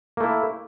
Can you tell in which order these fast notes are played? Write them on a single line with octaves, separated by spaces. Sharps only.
A#3 A3 E4